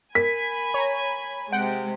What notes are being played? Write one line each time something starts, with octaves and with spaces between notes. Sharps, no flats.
A#4 G#5 B5 B6
C#5 A#5
C3 G#3 F#5 G5 D7